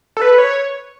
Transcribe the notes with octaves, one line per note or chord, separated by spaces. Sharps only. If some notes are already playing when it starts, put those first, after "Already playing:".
A4
B4
C#5